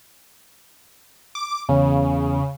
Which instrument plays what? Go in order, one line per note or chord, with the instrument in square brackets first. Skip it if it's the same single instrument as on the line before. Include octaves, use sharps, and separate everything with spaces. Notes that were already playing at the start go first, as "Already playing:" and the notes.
[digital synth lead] D6
[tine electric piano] E2 C#4 [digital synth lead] C#3